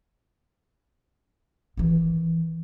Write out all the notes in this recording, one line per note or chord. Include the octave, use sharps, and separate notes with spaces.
D#3 E3